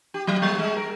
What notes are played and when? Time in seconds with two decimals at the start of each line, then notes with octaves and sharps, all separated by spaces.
0.14 G4
0.27 F#3
0.42 G3
0.58 G#3
0.76 A#4